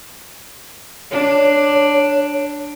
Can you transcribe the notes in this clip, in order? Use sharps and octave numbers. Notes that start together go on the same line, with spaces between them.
D4 C#5